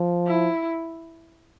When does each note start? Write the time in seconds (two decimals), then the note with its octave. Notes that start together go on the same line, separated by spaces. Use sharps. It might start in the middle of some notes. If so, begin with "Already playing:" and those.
Already playing: F3
0.27 E4